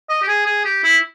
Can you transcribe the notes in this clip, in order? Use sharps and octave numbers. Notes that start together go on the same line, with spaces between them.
D#5
G4
G#4
G#4
G4
E4